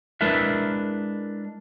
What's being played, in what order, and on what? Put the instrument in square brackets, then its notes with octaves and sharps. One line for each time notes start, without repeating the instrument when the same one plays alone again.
[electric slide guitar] G#3 D4 E4 A#4 B4 E5